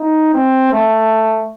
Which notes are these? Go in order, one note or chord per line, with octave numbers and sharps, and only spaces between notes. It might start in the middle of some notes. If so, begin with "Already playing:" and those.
Already playing: D#4
C4
A3